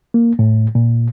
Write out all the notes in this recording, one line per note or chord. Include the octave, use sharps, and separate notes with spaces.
A#3
A2
A#2